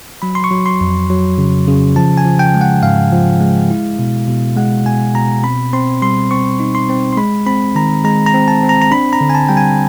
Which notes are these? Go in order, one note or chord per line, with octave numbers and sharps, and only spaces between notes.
F#3 B5
C6
C#6
F#3
C6
F2
F#3
C#3
C#3
F3 A5
G#5
F3
G5
G#3
F#5
G#2 F5
F3
G#3
E4
B2
B2
G#3 F#5
B2 G#5
B2 A#5
C4 B5
C4 C6
G3 C6
C4 C#6
D#4
C6
C4
C6
G#3 B5
C4 B5
D#3 A#5
G#3 A#5
A#5
C4
A5
C4
A#5
A#5
D4 B5
A#5
D3
G#5
A5
G3 G5
G#5